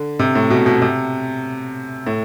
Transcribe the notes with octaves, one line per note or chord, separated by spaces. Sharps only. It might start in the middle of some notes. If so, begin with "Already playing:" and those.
Already playing: D3
C3
A2
B2
B2
C3
A2